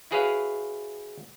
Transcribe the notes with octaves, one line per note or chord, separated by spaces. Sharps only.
E4 F#4 G#4 B4 C#5 F5